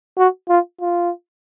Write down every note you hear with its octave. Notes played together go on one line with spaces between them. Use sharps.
F#4
F4
F4